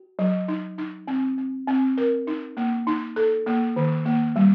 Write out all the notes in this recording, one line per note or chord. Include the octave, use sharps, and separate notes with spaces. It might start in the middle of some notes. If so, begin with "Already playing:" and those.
Already playing: F#4
F#3
D#4
D#4
C4
C4
C4
A#4
D#4
A#3
D#4
A4
A#3
D#3
A#3
G3